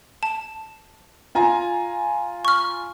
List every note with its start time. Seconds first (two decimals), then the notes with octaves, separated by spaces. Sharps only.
0.23 A5
1.35 F4 G#5 A#5
2.45 C#6 F6